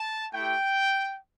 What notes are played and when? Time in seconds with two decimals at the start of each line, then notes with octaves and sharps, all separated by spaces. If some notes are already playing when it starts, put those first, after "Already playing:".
Already playing: A5
0.33 A3 E4 G4 G5